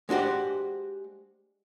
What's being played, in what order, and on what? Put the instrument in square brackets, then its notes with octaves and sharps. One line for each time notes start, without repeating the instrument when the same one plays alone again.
[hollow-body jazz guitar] G#3 D4 F#4 G4 C5